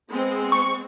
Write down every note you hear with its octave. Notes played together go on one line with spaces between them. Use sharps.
G#3 B3 C4
C#6